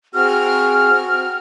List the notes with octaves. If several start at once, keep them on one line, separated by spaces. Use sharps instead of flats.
C4 F#4 G#4 F6